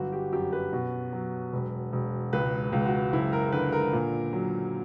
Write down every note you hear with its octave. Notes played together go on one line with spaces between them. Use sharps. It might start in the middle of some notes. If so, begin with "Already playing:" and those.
Already playing: G1 F#3 F#4
G4
F#2 G4
B4
B2
F#3
E1
E1
C#2 B4
C#2
F#4
F#1 E4
A#4
D3 B4
A#4
A#2
F#3